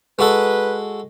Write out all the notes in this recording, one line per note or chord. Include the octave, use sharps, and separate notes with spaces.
G#3 F#4 A4 B4